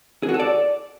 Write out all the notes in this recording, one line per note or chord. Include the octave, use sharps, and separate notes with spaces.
G#4
F#4
A4
D5